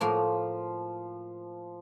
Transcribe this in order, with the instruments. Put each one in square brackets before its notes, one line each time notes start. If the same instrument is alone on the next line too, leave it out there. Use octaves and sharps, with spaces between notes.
[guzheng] A2 A#3 F#4 [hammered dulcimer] F3